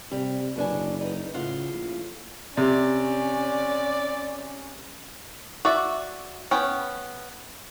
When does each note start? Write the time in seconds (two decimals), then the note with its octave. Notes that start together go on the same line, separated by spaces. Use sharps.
0.11 C3 G3
0.56 F#1 B2 D4 G#5
1.01 B3 D#4
1.34 A2 C#3 F4 F#5
1.73 A#1
2.57 C3 C#4 D5
5.65 F#4 D5 E5
6.51 B3 C#4 G5